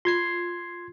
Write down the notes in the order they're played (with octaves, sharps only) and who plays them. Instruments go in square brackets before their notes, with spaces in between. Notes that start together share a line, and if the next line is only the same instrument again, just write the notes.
[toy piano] F4 [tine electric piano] C6 G#6 C7